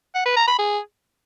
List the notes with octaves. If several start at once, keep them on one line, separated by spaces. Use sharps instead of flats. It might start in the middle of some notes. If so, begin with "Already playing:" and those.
F#5
B4
A#5
B5
G#4